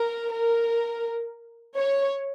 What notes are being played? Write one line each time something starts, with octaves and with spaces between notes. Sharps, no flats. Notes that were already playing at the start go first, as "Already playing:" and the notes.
Already playing: A#4
A#4
C#5